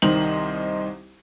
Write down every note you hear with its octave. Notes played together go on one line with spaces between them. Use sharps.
C2 D#3 D#4 C5 F#7